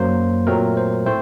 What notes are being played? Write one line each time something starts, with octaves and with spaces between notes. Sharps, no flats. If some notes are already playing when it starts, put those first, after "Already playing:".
Already playing: F#2 F#3 A#3 C5
A#2 F#3 A3 C4 A#4
C5
A2 A3 C4 C5